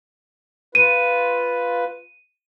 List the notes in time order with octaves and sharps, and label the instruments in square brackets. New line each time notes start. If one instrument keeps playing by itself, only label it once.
[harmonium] F4 B4 [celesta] D#7